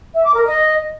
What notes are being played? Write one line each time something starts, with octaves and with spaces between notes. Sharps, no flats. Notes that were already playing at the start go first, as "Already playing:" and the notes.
E5
D6
A#4
D#5